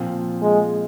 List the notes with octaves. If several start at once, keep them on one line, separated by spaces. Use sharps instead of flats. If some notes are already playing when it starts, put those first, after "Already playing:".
Already playing: A#2 F3 C4 F4
G#3